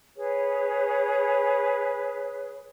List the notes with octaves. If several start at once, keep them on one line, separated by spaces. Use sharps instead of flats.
G#4 B4 C#5